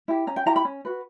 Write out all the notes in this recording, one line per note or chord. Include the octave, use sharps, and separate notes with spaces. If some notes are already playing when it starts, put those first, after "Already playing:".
E4 G4
C#4 A#5
G5
E4 G4 A#5
B5
C#4
F#4 B4